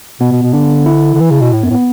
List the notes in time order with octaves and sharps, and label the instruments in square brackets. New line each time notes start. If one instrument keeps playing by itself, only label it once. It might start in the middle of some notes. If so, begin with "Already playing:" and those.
[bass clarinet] B2 [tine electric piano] B3
[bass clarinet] B2
B2
[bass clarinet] D3 [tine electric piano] D4
[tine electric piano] E4
[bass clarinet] D3
E3
C#3
B2
A2
[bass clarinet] F#2 [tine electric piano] B3
[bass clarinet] A2
[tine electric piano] B3